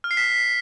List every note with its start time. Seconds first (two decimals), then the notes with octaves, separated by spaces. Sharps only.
0.04 F6
0.11 C7
0.17 B6